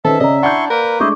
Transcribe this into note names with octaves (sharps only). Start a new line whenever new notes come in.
D#3 C#4 A4 B4 C5 E5
C#3 C#4 D5 D#5 A#5
D4 E4 F#5 C6 C#6 G6
A#3 A#4 B4
G#3 A3 D4 E4 C5 D#5 C#6 D6